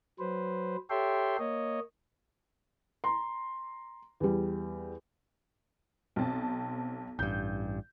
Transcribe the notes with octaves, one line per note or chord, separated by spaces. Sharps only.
F#3 B4 C5
G4 A4 C#5 E5 G5 C6
A#3 C#5 D#5
A#5 C6
E2 G3
B1 C4 A5
A1 G2 G6